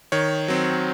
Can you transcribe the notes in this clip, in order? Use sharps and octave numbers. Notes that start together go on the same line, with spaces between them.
D#3 C#5
F#3 C4